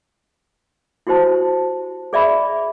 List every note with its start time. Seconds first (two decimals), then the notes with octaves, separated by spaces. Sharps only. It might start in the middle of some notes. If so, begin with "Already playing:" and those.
1.07 E4 F#4 G4 C5 A5
2.13 G#4 D5 E5 B5